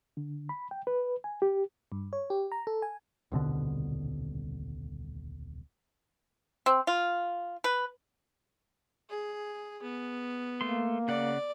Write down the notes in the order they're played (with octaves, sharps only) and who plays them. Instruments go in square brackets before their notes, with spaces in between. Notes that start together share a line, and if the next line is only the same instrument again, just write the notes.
[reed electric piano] D3
B5
G5
B4
G#5
G4
[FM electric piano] G2
C#5
G4
A#5
A4
G#5
[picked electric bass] D#1 C2 B2 D3
[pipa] C4
F4
B4
[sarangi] G#4
B3
[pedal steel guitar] A3 C6 [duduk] A#3
[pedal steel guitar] C#3 F#5 [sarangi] D5